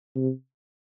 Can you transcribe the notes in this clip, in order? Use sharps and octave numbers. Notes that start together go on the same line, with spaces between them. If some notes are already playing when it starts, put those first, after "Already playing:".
C3